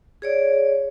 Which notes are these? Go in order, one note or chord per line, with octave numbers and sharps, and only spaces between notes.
G#4 C#5 D5